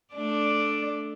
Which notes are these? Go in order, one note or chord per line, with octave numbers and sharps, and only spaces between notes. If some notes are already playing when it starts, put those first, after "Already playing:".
A3 D4 D5